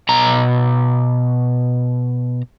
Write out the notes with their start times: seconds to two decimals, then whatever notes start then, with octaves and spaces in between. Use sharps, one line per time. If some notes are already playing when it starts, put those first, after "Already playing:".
0.09 B2 A#5